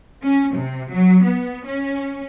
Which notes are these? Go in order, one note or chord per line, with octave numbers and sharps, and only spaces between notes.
C#4
C3
F#3
B3
C#4